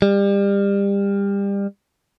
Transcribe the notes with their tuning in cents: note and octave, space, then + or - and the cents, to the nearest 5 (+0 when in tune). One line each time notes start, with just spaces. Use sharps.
G3 +30